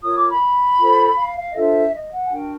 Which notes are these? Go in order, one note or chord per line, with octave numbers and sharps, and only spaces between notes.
F4 A#4 C#5 D#6
D6
B5
F4 A4 C5
F5
F5
D#5
D4 F4 A4 C5 E5
D#5
F#5
G#5
D4 F#4 A#4 G5